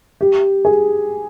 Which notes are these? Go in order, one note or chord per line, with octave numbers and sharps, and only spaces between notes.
G4
G#4